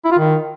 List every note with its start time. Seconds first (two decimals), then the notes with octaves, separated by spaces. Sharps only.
0.05 E4
0.12 F4
0.19 D#3